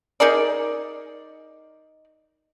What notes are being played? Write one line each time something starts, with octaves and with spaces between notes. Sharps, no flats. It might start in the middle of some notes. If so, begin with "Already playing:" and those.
D#4 G#4 A#4 D5